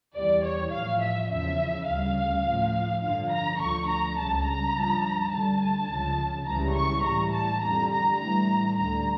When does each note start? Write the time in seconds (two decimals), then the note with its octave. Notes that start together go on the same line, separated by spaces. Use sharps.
0.14 E2 E3 G3 D5
0.44 C#5
0.72 A2 F3 F5
1.01 E5
1.30 E2 C#3 F3 E5
1.87 D2 C#3 G3 F5
2.45 A2 F3
3.02 G2 D3 F3 F5
3.31 A#5
3.60 D2 D3 F3 C#6
3.88 A#5
4.17 C#2 C#3 G3 A5
4.46 A#5
4.75 G2 F3
5.32 D2 D3 G3 A5
5.89 C#2 C#3 F3
6.47 C#2 C#3 E3 G3 A#5
6.76 C#6
7.04 A2 E3 G3 A#5
7.33 A5
7.62 F2 D3 G3 A#5
7.91 A#5
8.19 A2 E3 G3 A#5
8.77 D2 D3 G3 A#5